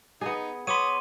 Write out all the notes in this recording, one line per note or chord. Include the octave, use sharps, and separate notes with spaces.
B3 D#4 G#4
B3 C#5 B5 C6 D6 D#6 D#7